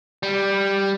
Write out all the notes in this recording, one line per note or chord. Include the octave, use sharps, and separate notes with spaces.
G3